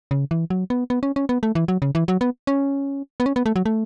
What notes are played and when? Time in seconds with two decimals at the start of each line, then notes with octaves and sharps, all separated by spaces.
0.11 C#3
0.31 E3
0.50 F#3
0.70 B3
0.90 B3
1.03 C#4
1.16 C#4
1.29 B3
1.43 A3
1.55 E3
1.68 F#3
1.82 C#3
1.95 E3
2.08 F#3
2.21 B3
2.47 C#4
3.20 B3
3.26 C#4
3.36 B3
3.46 A3
3.56 F#3
3.66 A3